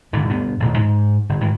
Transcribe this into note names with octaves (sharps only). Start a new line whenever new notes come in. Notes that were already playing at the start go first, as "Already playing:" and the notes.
G#1 G#2 D3
D2 G2 B3
D#1 A1
G#2
G1
G#2 D#3 E3